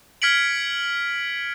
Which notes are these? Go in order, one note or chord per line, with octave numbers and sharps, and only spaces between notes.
F6 G#6 B6 C#7 D7 F#7